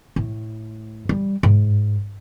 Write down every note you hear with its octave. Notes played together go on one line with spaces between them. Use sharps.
A2
G3
G#2